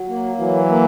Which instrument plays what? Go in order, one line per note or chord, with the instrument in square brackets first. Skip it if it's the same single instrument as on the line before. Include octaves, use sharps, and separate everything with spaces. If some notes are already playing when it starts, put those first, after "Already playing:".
Already playing: [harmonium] F#3
A#3
[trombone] E3 [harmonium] F#3
[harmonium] A#3